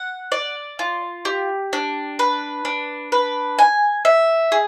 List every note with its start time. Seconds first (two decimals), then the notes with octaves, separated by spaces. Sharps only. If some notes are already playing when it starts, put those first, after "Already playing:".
Already playing: F#5
0.32 D5
0.79 F4
1.25 G4
1.73 D4
2.19 B4
2.65 D4
3.12 B4
3.59 G#5
4.05 E5
4.52 G#4